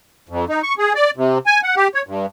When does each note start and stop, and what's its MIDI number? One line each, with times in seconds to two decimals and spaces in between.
0.29 0.45 41
0.49 0.62 63
0.63 0.74 85
0.78 0.93 68
0.95 1.11 74
1.16 1.38 48
1.46 1.61 80
1.63 1.75 78
1.77 1.88 67
1.95 2.02 73
2.07 2.26 43